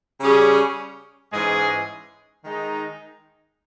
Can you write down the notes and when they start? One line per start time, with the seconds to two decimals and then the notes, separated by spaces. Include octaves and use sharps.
0.21 C#3 G3 C#4 G#4
1.33 G#2 E3 G#3 C#4 G#4
2.44 D#3 G#3 D#4